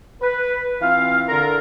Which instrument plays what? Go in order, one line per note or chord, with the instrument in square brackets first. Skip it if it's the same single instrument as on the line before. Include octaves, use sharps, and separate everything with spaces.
[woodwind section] B4
E3 C4 F4 F5
D3 F4 A#4